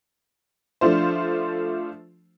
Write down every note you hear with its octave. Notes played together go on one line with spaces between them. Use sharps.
F3 A3 D4 F4 C5